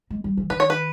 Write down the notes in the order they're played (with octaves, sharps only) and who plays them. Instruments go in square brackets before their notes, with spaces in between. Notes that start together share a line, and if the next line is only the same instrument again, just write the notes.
[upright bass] G#3
G3
E3
[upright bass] D#3 [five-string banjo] B4
[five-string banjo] C#5
B4